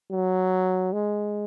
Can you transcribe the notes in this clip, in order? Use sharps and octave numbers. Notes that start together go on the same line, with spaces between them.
F#3
G#3